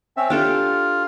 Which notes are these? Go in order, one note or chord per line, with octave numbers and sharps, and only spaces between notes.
C4 C#4 E5
D4 F4 G4 A4